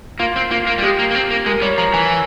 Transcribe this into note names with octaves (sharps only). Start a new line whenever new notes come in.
A#3 F4
C4
A#3 F4
A#3
G3
G#3 G4
A#3
A#3
C4
A#3
G#3 A#4
G3 C#5
F3 A#5
E3 G#5